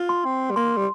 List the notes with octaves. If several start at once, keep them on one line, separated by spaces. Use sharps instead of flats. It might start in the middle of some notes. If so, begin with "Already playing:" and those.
Already playing: F4
C6
C4
G3
A#3 C6
G3